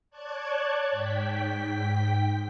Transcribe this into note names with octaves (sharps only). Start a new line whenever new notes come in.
C#5 D5 A5 F#6 G#6
G#2 G5 B6